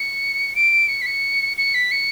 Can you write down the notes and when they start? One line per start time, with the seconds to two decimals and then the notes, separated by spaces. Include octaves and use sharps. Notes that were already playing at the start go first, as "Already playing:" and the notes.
Already playing: C#7
0.55 D7
0.88 C#7
1.02 B6
1.06 C#7
1.57 C#7
1.74 B6
1.91 C#7